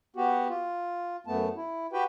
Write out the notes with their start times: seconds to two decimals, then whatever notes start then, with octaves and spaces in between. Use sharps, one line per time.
0.16 B3 F#4 G4
0.49 F4
1.27 F#2 A3 B3 A5
1.56 E4
1.93 F#4 G4 B4 G5